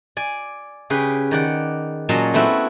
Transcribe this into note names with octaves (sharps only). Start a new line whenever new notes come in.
D5 G#5
C#3 G4 G#4 B4
D#3 D5 F#5
A#2 F#3 C#4 C#5 D#5 A5
A3 B3 C4 E4 F#4 B4